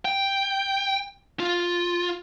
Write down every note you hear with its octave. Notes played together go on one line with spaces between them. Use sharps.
G5
F4